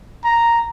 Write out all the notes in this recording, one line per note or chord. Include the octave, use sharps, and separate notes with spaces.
A#5